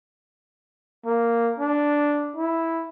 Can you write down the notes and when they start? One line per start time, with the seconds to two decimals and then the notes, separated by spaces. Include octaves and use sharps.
1.05 A#3
1.58 D4
2.36 E4